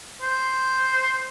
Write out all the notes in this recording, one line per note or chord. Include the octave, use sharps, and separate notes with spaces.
C5